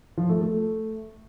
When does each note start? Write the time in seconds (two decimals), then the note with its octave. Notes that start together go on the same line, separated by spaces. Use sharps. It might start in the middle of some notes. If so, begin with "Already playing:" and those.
0.17 F3
0.29 A3
0.41 A3